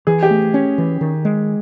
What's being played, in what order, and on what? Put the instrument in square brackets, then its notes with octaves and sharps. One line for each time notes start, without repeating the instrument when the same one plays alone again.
[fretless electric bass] E3 [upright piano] G#4
[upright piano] G4
[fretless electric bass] A3
C#4
E3
D#3
G#3